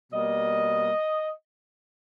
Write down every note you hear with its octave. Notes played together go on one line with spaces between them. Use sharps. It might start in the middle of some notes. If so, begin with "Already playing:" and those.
B2 G3 A#3 D#5